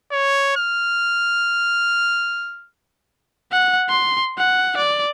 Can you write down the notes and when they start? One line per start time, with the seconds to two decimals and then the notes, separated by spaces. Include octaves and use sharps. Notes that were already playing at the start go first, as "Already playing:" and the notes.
0.11 C#5
0.56 F6
3.52 F#5
3.89 C6
4.38 F#5
4.77 D5